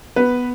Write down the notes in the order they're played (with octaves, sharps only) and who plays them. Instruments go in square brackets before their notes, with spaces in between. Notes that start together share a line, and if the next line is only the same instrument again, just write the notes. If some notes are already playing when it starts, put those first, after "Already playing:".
[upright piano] B3 B4